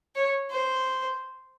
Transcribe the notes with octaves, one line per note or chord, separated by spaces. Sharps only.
C#5
C5